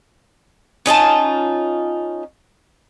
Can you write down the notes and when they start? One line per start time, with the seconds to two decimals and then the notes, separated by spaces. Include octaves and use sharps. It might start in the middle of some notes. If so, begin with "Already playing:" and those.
0.86 C#4 D#4 F4 A5